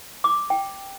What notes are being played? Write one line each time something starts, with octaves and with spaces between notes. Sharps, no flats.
D6
G5